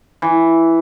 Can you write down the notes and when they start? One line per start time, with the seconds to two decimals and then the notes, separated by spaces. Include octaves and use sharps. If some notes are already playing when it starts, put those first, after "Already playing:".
0.22 E3